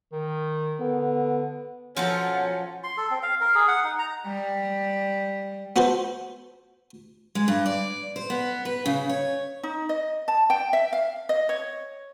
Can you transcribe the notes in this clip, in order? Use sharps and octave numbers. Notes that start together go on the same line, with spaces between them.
D#3
D3 B3
B2 F3 F#3 C#4 F4 A4 F#5
C6
A4
C4
F5
A#4
G#4
F#5
D#4
A#5
G3
B3 F#4 A4 B4 C5
G#3
G2
D5
C5
B3
B4
C#3
C#5
D#4
D#5
A5
G5
E5
F5
D#5
C#5